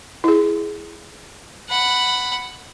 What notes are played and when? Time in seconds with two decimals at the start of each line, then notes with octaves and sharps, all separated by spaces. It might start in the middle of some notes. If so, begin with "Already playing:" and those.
0.24 E4 G#4
1.69 F#5 B5